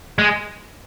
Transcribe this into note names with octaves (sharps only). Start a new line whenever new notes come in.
G#3